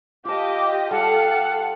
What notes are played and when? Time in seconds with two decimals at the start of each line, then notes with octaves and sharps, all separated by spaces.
0.25 F4 G4 D#5 A5 D6
0.91 G3 A4 F5 F#5